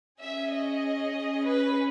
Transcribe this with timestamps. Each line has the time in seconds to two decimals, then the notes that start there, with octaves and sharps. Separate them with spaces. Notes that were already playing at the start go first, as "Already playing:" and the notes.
0.20 C#4 G#4 E5
0.51 D#5
1.45 B4